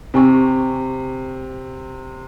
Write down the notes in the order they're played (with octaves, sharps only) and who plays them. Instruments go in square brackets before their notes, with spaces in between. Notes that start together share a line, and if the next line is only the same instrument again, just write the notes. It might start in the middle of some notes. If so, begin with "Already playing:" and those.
[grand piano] C3 [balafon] C4 G#5 C#6